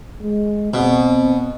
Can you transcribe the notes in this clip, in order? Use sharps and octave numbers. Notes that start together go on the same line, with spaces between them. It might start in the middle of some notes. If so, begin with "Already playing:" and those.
G#3
B2 C4